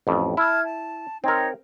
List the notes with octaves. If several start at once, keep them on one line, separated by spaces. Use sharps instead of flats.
A1 F2
E4 A5 F6 G#6
A5
C4 D#4 A#4 C#5